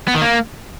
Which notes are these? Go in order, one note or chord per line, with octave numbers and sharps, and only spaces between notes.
B3
D#3
A#3